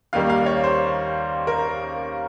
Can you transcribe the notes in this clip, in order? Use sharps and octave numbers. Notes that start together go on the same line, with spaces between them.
D#2 D#3 G3 A#3 F5
F5
C#5
C5
A#4